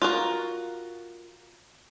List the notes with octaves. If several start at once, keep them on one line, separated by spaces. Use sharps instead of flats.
F4 F#4 A#4